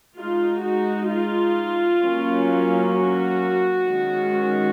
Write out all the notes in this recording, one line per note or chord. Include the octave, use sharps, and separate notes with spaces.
G#3 D#4 F4
F#4
F4
F#3 A#3 C#4
F#4
D#3 G#3 C#4